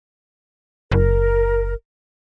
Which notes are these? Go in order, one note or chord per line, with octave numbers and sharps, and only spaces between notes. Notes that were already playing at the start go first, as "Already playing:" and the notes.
F#1 A#4